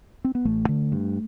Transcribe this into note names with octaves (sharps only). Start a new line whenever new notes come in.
C4
B3
A1 A3
D3
G2